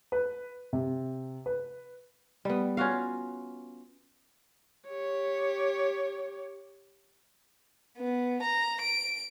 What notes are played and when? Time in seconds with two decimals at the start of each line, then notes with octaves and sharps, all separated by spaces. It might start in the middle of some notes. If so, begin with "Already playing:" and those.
0.12 B4
0.73 C3
1.46 B4
2.45 G3 B3
2.77 C#4 F4 F#4 F5
4.89 G4 C#5
7.98 B3
8.43 A#5
8.81 D7